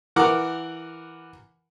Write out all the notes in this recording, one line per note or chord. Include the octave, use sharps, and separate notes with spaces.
E3 A#4 F#5 A#5 D6